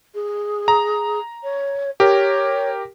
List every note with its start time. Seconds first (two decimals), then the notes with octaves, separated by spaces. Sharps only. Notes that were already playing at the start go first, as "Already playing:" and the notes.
0.15 G#4
0.68 A#5
1.43 C#5
2.00 G4 A#4 C#5